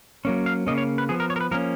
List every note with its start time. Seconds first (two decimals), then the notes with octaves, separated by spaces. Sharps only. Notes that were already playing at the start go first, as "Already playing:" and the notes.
0.25 F#3 A#3 C#4
0.46 F5
0.66 C#3 F3 A#3 C#4 D#5
0.78 C#5
0.98 B4
1.09 F3 B3 G#4
1.20 A#4
1.30 C#5
1.36 A#4
1.41 B4
1.51 F3 A#3 C#4 A#4